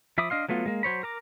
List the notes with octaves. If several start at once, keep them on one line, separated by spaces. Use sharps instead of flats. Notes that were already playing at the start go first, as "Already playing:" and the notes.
F3 E5 B5 D6 D#6
D4 D#5 F5 C6
F#3 A3 B3 F4
G#3 A#3
F#3 C5 C#5 B5
A#4 A#5 D6